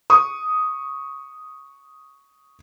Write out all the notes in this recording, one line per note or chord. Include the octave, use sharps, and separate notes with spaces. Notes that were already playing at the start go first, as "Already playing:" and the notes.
C#6 D#6